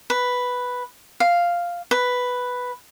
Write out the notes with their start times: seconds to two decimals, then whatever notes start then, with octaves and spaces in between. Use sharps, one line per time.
0.10 B4
1.20 F5
1.91 B4